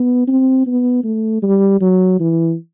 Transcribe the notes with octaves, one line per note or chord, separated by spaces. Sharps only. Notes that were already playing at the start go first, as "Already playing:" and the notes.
Already playing: B3
C4
B3
A3
G3
F#3
E3